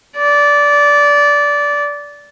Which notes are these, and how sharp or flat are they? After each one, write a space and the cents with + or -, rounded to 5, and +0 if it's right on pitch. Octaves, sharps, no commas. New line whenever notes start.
D5 -15